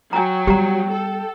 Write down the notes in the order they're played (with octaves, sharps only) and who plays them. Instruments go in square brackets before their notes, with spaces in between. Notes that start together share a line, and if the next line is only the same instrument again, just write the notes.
[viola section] F#3 [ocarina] G5 [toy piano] G#5 A#5
[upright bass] G3 B3 [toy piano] G4 A#5
[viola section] A4